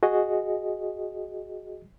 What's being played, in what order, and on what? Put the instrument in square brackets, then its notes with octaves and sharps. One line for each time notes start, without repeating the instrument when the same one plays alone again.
[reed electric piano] F#4 G#4 D#5